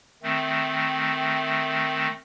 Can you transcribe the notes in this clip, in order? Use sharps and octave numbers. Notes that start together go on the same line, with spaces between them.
D#3 A3 C4